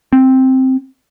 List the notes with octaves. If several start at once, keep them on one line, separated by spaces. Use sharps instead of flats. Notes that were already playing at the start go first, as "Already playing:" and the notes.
C4